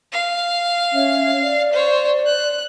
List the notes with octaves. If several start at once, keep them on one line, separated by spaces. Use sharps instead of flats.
F5
C#4 C#5 E5
D5
C5 C#5
F#6